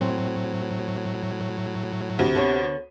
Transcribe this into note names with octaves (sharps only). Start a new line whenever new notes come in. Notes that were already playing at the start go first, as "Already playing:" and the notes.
A2 F#3 C4
D2 C3
D3 B3 C#5